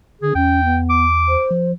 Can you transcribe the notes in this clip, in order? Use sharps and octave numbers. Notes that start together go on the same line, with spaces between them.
D3 G#4
E2 C#4 G5
B3
D6
C5
F3